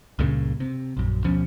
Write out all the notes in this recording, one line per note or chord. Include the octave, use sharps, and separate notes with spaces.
C#2 G2 A#2 C#3
C3
A#1 F#2
D2 B2 F3 C#4